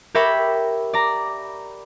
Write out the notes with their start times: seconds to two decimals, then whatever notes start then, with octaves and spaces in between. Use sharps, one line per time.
0.15 G4 A#4 C#5 E5 G5 B5
0.93 D5 A#5